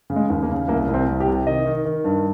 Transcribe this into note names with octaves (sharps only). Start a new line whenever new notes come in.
C#3
G#3
D#2
A#3
C#3
C2 A#3
C2
C4
C2
G4
C3
D#3 D#5
D#3
D#3
G2